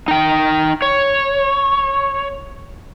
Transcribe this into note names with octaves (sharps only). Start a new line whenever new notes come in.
D#4 G5
C#5